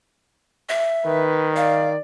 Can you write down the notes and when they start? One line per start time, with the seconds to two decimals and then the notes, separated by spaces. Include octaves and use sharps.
0.69 E5
1.06 D#3 B4
1.56 D5 F5